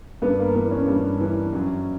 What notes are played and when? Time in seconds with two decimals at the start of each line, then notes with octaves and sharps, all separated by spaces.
0.22 G2 B3
0.39 A#3
0.55 E3 B3
0.71 C#4
0.88 G2
1.20 E3
1.53 F#2